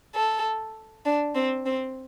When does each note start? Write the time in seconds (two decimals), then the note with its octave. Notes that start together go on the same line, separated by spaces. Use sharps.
0.15 A4
1.06 D4
1.35 C4
1.66 C4